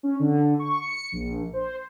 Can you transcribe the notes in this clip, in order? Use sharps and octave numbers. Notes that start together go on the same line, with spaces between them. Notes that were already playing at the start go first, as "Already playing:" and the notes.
C#4
D3
C#6
C#7
A#1
C5